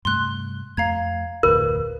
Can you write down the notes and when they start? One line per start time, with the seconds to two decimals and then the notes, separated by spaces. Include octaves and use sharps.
0.05 G2 C3 A3 C6 F#6
0.77 F2 A3 F5 A#5 G#6
1.43 F1 D2 A2 A#4 B4 B5